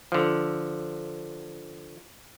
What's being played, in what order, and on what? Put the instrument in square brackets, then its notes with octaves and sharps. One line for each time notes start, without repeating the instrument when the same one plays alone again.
[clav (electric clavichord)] D3 F3